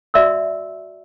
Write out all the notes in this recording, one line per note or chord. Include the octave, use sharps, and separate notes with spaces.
F#4 D5 E5 C6 E6